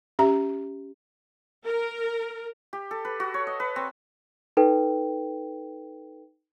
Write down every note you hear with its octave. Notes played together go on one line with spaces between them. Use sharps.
C#4 G4 E5 A#5
A#4
G4
A4
B4
F#4
C#5
D#5
B4
C4
D#4 A4 B4 G5